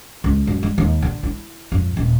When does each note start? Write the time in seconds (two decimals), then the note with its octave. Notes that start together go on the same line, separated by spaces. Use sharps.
0.24 C#2
0.47 F#2
0.63 G3
0.78 D#2
1.02 D3
1.23 E4
1.72 F2
1.97 D#1